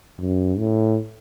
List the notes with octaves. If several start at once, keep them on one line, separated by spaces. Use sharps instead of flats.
F#2
A2